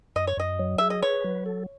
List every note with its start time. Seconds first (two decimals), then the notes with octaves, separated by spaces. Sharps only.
0.16 F#2 D#5
0.27 C#5
0.37 F#2 D#5
0.59 F#3
0.78 G#4 E5
0.90 D#5
1.02 B4 C#5
1.24 F#3
1.46 A4